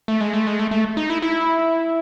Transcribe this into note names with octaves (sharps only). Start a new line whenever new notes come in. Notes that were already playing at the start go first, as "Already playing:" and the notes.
A3
G#3
A3
G#3
A3
A3
D#4
E4
E4